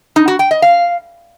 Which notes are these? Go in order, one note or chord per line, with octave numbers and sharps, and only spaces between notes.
D#4
F#4
G5
D#5
F5